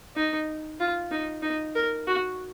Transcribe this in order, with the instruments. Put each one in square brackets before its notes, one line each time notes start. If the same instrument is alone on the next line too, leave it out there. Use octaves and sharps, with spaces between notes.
[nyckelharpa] D#4
F4
D#4
D#4
A#4
F#4